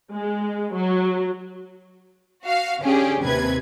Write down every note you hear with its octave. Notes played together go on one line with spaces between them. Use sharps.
G#3
F#3
F#4 F5
D3 C#4 G4 G#4
D#2 C3 B4 G#6